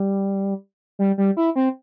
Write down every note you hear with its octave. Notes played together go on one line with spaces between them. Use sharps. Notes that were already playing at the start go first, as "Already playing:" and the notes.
Already playing: G3
G3
G3
E4
C4